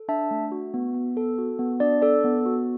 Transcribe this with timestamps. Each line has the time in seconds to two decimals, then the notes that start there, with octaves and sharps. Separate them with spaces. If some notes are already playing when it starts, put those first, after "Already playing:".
Already playing: A4
0.08 D4 E5 A5
0.31 A3
0.52 F#4
0.74 B3
0.94 B3
1.17 A4
1.38 F#4
1.59 B3
1.80 D4 D5
2.02 A4 D5
2.24 B3
2.46 F#4